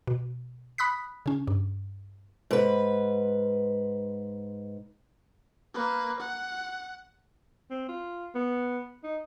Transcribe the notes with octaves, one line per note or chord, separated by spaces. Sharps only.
B2
B5 D#6 F#6 B6
C#3 C#4
G2
G#2 B4
A#3 B4
F#5
C4
F4
B3
D#4